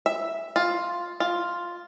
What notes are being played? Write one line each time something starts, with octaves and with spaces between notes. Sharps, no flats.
E5
F4
F4